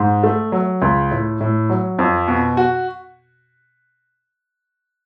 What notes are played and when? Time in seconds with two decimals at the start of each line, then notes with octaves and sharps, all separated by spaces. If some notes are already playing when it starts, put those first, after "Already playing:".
Already playing: G#2
0.23 A3
0.52 F#3
0.82 C#2
1.11 A2
1.40 A2
1.69 F#3
1.99 F2
2.28 B2
2.57 F#4